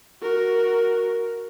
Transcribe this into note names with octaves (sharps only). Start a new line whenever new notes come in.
F#4 A#4